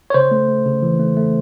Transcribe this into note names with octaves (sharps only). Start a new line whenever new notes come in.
C#5
C#3 C5
A3
A3
C#3
E3
A3
A3